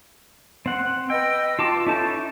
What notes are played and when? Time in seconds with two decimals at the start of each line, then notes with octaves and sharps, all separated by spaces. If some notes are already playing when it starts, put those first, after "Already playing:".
0.66 C4 F#5
1.10 B4 D#5 G5 E6
1.59 F4 A5 D6
1.87 C#4 D#4 E4 A4 A5